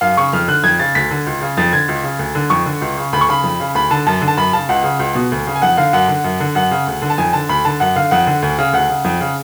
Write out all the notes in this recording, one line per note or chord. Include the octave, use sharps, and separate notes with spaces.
F#2 F5
C#3 C#6
F2 F6
D3 F#6
F2 G#6
C#3 A6
D2 B6
D3
C#2
C#3
F2 A6
D3 G#6
C#2
C#3
D2
D3
F2 C#6
D3
C#2
C#3
D2 B5
C#6
C#3 B5
F2
C#3
D2 B5
D3 A5
F#2 A5
D3
A5
F#2 B5
C#3 A5
C#2 F#5
C#3
C#2
B2
D2
C#3
G#5
F2 F#5
D3 F5
F#2 F#5
D3
F#2
D3
F#2 F#5
C#3
D2
D3
A5
F2 G#5
D3 A5
D2 B5
D3 A5
F#2 F#5
D3 F5
F2 F#5
D3
D2
C#3
D2 F#5
C#3
F2
C#3